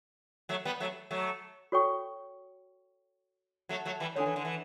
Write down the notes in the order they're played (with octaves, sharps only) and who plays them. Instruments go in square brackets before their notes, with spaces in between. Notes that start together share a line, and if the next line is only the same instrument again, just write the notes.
[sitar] F#3 A3
G3 B3
F#3 A3
F#3 A3
[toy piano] F#4 A4 C#5 G5 C#6
[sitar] F#3 A3
F#3 A3
E3 G3
[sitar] D3 [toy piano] D4 A4 C#5
[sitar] E3
D3
E3